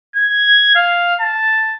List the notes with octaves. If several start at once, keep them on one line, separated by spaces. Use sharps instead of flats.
G#6
F5
A5